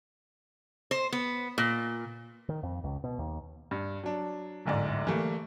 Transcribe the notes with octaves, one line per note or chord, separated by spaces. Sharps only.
C5
B3
A#2
D#3
F2
C#2
B2
D#2
G2
F#3 D4
D1 G1 G#2 D5
E3 G3 A3 A#3